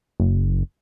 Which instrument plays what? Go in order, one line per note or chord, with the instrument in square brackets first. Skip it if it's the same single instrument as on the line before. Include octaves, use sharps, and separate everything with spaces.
[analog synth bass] F#1